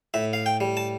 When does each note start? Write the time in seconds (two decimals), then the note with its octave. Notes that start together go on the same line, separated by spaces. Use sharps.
0.14 A2 E5
0.33 F5
0.46 G5
0.61 G3
0.77 A5